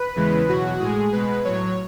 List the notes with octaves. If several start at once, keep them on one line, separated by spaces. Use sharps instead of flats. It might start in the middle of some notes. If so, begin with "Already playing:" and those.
Already playing: B4
E2 C#3 E3 G#3
E2 B2 F#3 F#4
A2 G#3 G#4
B2 G#3 B4
A2 F#3 C#5